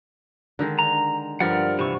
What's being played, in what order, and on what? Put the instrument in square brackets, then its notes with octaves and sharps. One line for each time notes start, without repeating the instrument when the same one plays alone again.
[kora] D3 D#3 G#3
[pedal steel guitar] A#5
[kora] G2 F3 G3 [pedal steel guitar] A#4 D5 F#5
[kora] C3 [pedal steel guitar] E3 C#6